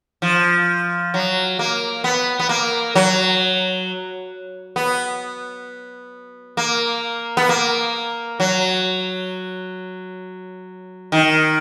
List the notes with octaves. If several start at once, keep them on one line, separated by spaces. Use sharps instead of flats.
F3
F#3
A#3
B3
B3
A#3
F#3
B3
A#3
B3
A#3
F#3
D#3